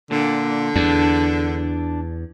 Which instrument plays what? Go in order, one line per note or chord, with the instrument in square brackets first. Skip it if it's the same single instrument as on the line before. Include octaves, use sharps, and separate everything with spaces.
[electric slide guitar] A#2 [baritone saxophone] D3
[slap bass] E2 [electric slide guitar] D4